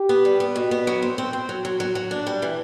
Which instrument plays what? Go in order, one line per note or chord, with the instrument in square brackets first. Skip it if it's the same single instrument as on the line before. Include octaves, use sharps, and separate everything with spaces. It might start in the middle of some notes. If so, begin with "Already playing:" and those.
Already playing: [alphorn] G4
[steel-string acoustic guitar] B3
G3
B3
B2
B3
F#3
C4
C4
C4
F#3
F#3
F#3
F#3
D4
G3
E3